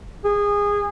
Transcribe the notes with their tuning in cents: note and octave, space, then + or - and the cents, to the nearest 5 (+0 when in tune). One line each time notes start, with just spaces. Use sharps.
G#4 -20